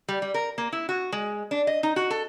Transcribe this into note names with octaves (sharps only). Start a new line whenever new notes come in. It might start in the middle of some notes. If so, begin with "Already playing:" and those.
G3
G3
A#4
A#3
E4
F#4
G#3
D4
D#5
D#4
F#4
A4